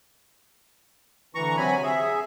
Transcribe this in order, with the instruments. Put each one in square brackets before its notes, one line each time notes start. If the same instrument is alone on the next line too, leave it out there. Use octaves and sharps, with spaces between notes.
[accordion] D2 E3 A#5 C#6
C3 F#3 G#5 B5
G#4 E5